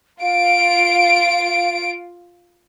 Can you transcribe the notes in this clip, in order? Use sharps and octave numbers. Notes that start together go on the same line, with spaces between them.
F4 F5 D7